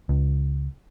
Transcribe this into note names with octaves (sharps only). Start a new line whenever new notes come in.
C#2